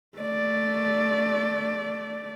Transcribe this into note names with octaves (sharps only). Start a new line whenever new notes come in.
A3 D5